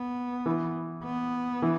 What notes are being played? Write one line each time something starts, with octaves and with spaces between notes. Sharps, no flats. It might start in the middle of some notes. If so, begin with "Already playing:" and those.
Already playing: B3
E3
B3
E3